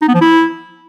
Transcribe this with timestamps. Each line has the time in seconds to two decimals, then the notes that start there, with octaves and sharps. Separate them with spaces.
0.02 D#4
0.08 B3
0.15 F3
0.21 E4